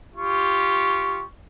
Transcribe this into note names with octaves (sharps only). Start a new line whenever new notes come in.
F4 G4 C#6